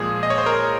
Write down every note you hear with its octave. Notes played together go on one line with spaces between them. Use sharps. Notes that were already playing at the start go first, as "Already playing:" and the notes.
Already playing: A#2 F3 G#3 G#4
D#5
C#5
C5
A#4